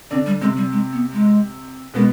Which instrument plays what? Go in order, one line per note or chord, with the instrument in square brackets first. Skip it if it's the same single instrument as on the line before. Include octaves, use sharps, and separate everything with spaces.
[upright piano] D3 D4 [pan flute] C4
[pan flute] G3
[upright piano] C3 C4 [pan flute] G#3
[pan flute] G3
G#3
B3
G#3
[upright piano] B2 B3 [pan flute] G#3